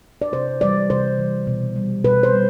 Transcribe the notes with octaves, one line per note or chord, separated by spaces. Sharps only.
D5
C3 C5
E3 G3 D5
C3 C5
E3 G3
B2
G3
B2 B4
C5
G3